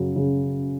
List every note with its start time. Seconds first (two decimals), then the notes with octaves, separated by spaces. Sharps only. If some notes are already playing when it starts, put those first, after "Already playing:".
Already playing: F#2 C#3 F#3
0.16 C#3